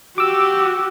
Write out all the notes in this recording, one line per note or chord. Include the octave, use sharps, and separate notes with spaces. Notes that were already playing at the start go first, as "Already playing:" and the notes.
F#4 G4 D6 E6